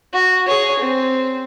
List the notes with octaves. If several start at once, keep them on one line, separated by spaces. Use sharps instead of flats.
F#4
G#4 C#5
C4